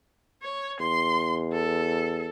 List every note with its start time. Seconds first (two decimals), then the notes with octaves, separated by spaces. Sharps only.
0.42 C#5
0.80 E2 C6
1.53 A4